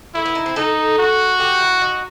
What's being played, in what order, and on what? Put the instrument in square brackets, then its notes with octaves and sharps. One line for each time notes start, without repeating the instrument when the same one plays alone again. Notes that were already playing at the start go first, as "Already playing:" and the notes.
[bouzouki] A3 [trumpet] E4
[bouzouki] B3
D#4
C4
[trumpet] D#4 [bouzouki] A4
[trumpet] F#4
[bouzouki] G4
E4
D#4